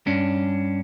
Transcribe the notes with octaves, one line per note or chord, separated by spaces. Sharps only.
G2 C#4 D4